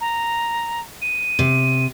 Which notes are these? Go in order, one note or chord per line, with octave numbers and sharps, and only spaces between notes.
A#5
D#7
C3